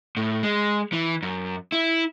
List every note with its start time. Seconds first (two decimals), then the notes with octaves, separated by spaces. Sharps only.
0.17 A2
0.43 G#3
0.93 E3
1.22 F#2
1.72 E4